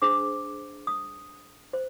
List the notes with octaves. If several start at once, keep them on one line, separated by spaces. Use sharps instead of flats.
D4 G#4 C5 D6
D#6
C5